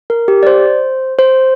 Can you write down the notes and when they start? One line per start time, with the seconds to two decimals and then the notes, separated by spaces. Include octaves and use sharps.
0.10 A#4
0.28 G4
0.43 D5
0.47 C5
1.19 C5